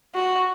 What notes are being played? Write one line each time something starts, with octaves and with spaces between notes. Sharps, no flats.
F#4